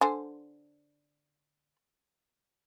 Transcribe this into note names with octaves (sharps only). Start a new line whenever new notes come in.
D3 C5 G#5